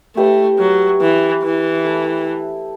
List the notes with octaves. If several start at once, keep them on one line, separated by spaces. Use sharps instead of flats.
A3 E4 G4 B4 D#5
F#3
E3
E3
A3 E4 A4